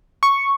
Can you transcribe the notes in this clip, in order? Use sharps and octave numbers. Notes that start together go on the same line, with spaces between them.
C#6